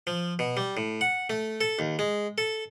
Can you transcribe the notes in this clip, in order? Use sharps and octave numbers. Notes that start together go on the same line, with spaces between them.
F3
B2
G3
A2
F#5
A3
A4
D#2
G#3
A4